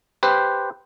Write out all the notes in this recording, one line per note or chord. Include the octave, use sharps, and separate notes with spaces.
G4 B4 C5